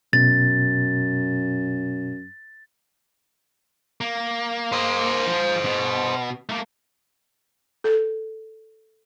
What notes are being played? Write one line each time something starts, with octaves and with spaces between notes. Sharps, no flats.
F#2 B2 A6
A#3
C5 D#5
F3
B2
A3 A#3
A4